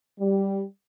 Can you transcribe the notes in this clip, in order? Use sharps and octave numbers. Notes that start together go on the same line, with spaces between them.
G3